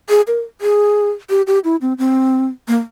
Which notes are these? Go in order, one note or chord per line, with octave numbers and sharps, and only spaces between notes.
G#4
A#4
G#4
G4
G4
E4
C4
C4
A#3